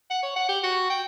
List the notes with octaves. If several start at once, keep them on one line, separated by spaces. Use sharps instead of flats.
F#5
C#5
F#5
G4
F#4
G5